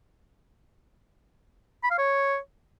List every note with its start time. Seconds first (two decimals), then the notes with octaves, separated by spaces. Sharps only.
1.84 B5
1.91 F5
1.98 C#5